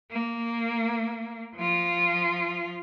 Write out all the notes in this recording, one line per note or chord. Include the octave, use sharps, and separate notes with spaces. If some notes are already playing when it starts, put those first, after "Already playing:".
A#3
F3 F4